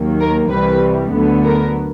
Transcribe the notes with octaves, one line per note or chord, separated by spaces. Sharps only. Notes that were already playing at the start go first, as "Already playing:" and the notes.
Already playing: D#2 D#3 F#3 A#3
A#4
C2 C3 E3 G3 B4
D2 D3 F#3 B3
A#4